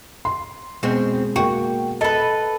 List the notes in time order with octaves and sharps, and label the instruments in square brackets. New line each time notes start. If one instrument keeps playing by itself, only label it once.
[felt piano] C6
[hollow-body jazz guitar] B2 G#3 [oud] C4 F#4
[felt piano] A#3 G5 [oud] F#4
[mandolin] A4 B4 [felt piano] D#5